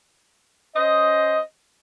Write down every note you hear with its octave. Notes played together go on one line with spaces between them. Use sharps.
C#4 C5 D#5